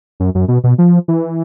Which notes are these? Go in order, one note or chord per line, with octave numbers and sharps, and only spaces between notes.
F#2
F#2
B2
B2
F3
E3